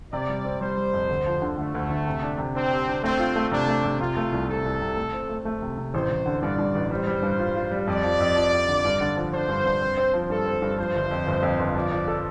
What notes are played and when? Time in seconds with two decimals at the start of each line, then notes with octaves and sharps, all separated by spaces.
0.13 C3 D5
0.29 G3
0.45 C4
0.61 G3 C5
0.77 G3
0.93 F2
1.09 D2
1.26 F3
1.42 D3
1.58 D3 A3
1.75 D2
1.90 D3
2.06 C3
2.22 D4
2.38 C3
2.54 C4 D4
2.71 G4
2.87 D4
3.03 A3 C4
3.19 F4
3.36 A3
3.52 C3 D4
3.67 A3
3.84 C3
4.00 C3 F4
4.17 A3
4.32 C2
4.49 C3 A4
4.64 C2
4.81 C3
4.97 A3
5.13 C4
5.29 A3
5.45 A3
5.62 C3
5.77 C3
5.94 A1 C5
6.10 A1
6.26 D3
6.42 G2 D5
6.58 G2
6.75 A1
6.91 G3 C5
7.07 G3
7.22 G2
7.39 F4
7.56 F4
7.71 G3
7.87 F2 D5
8.03 F3
8.20 F2
8.36 F3
8.52 F2
8.68 D3
8.85 G2
9.01 D3
9.17 F3
9.33 D4 C5
9.49 G2
9.66 G2
9.81 C4
9.97 C4
10.13 F3
10.30 G2 A4
10.46 C4
10.62 G2
10.78 F3 C5
10.95 G1
11.11 F2
11.27 G1
11.42 F2
11.59 G1
11.75 F3 D5
11.92 F3
12.07 A4